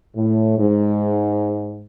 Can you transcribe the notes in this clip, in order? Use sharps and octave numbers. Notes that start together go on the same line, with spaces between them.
A2
G#2